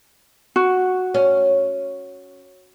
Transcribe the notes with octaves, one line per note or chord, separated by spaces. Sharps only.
F#4
C#4